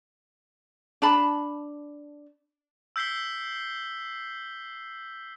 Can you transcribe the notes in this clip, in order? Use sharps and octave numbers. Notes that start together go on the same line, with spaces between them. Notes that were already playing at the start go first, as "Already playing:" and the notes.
D4 A5 B5
E6 G6 B6 C7 G7